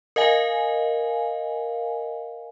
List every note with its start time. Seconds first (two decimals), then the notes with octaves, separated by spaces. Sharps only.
0.16 A#4 D#5 F5 G#5